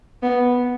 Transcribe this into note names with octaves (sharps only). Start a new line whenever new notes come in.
B3